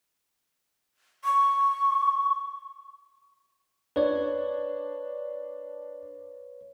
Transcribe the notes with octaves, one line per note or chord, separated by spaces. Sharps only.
C#6
D4 B4 C#5